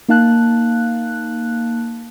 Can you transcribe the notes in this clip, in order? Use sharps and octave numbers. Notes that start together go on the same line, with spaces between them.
A#3 D#4 F5 A5 F#6